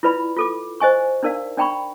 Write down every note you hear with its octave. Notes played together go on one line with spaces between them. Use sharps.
E4 F4 B4 D5 B5
F4 A4 D6
C5 D#5 G#5 C#6
D4 D#4 A#4 D5 F5
D4 D5 G5 A#5 B5 C#6